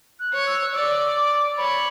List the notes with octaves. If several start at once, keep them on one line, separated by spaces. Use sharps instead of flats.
F#6
C#5
E6
D5 E6
D6
C#5 B5